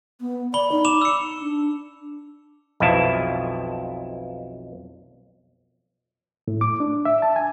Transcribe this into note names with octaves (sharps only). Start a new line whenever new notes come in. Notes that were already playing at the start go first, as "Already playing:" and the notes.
B3
D5 B5 G7
D#4
D6 E7 F7
E6 C#7
D4
B1 F2 B2 F3 E4 A5
A2
D6
D4
E5
A5
G#5